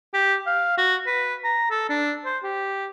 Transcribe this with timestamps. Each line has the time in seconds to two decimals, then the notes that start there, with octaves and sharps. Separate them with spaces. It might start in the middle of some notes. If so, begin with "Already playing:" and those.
0.14 G4
0.46 F5
0.78 F#4
1.06 B4
1.44 A#5
1.70 A4
1.89 D4
2.25 C5
2.43 G4